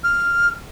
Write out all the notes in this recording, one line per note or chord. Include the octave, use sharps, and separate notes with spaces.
F6